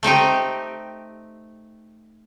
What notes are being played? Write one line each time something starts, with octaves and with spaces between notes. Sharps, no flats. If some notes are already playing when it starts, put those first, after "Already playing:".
A3 C4 D#4 G4